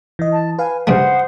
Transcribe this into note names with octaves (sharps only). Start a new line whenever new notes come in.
E3 D#5
A5
B4 F5 G#5
G2 C#3 A3 C5 F#5 D#6